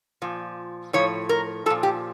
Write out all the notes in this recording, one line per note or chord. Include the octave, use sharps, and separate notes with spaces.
A#2 F3
A2 F3 C#5
A#4
A#2 F3 A4
G4